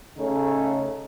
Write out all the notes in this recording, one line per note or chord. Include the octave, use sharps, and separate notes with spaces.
C#3 A3 C#4 D#4 A4